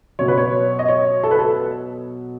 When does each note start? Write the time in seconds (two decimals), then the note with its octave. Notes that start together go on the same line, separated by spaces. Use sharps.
0.19 B2 F#3 C#5
0.28 B4
0.38 C#5
0.79 D#5
0.89 C#5
1.24 A4
1.31 B4
1.39 A4